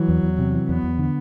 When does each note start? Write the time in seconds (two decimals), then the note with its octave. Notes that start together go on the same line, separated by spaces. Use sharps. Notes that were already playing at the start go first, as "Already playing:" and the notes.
Already playing: E3 F#3
0.08 E2
0.23 E2
0.38 C3
0.54 E3
0.68 E2 B3
0.84 E2
0.99 D3